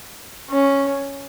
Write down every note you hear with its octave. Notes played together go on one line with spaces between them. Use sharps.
C#4